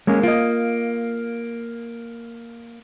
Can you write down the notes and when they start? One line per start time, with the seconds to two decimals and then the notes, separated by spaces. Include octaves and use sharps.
0.07 G#3 A#3 C#4
0.23 A#3 F4 D#5